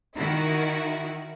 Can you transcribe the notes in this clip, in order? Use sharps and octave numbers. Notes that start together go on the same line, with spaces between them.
D#3 E4 F#4